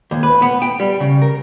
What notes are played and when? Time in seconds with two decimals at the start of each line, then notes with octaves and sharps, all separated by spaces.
0.11 D#2
0.23 B4
0.42 B3
0.62 G5
0.80 G3
1.00 C#3
1.22 A#4